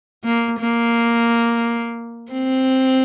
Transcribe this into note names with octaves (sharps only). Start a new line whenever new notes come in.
A#3
A#3
C4